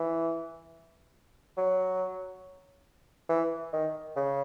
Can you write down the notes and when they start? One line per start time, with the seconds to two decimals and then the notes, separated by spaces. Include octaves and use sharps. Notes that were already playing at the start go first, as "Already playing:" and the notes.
Already playing: E3
1.57 F#3
3.29 E3
3.73 D#3
4.16 C#3